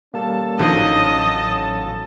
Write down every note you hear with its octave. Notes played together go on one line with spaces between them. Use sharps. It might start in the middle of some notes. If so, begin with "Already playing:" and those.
G3 A#3 C#4 A4 A5
A1 D3 D#3 F3 F#3 D#5 F5 D#6